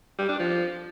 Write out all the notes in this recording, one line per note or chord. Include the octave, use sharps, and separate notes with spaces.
G3
D4
F3